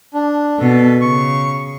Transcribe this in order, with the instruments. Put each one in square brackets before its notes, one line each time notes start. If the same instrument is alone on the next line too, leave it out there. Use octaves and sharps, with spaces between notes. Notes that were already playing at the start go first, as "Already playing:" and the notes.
[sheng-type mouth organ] D4
[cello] B2 B3 [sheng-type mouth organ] A4
[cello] C#3 [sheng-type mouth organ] C#6